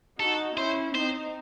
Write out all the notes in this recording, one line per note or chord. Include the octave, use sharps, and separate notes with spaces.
D#4 F#4 A4
C#4 E4 C5
C4 D#4 C5